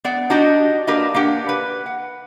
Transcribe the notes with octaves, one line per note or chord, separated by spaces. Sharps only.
B3 D5 F#5
D4 D#4 F#4 G4 D5 D#5
A#3 D4 G4 A#4 B4 D#5
A#3 D4 G4 F#5
B4
F#5